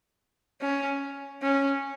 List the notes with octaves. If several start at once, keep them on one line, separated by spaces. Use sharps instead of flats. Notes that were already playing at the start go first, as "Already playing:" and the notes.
C#4
C#4